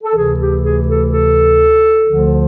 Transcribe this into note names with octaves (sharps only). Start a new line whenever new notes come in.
A4
D2 C3 E3 G#4
G4
G#4
A4
A4
D2 D3 F3